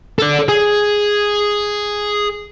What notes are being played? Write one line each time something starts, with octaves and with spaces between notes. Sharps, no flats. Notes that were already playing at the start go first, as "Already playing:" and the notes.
A4 D5
G#4